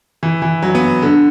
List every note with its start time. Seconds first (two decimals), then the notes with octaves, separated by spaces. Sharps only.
0.23 E3
0.42 E3
0.63 F#3
0.75 B3
1.02 D3